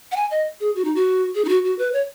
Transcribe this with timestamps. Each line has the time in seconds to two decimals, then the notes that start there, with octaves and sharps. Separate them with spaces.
0.12 F#5
0.16 G#5
0.31 D#5
0.60 G#4
0.76 F#4
0.85 D#4
0.95 F#4
1.35 G#4
1.45 D#4
1.49 F#4
1.64 F#4
1.79 B4
1.93 C#5